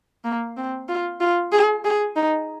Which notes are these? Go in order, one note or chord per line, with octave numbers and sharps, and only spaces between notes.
A#3
C4
F4
F4
G#4
G#4
D#4